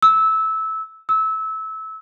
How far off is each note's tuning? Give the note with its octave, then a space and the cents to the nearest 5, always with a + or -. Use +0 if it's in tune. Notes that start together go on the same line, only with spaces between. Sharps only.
E6 -20
E6 -25